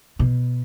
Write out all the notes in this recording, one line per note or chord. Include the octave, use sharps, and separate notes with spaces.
B2